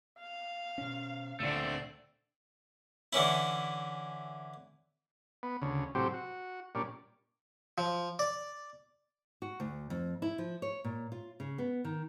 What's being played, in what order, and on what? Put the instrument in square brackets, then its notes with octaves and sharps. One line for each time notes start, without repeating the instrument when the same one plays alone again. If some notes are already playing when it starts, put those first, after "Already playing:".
[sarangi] F5
[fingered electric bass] B2 C#4
[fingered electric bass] D2 A#2 [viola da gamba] D3 D4 D5 [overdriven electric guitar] A3 C4
[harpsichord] D3 E3 C#4 E4
[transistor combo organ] B3
D2 C#3
A2 C3 F#3 G3 C4 G4
F#4
A#2 G3 C#4 D4
[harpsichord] F3
D5
[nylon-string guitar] F#4
D2
F2
E4
F3
C#5
A#2
F4
C#3
B3
D#3